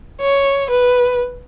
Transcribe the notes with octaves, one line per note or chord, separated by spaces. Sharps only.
C#5
B4